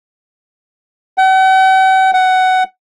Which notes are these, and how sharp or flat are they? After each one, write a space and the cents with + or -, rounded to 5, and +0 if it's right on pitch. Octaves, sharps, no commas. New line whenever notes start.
F#5 +45
F#5 +15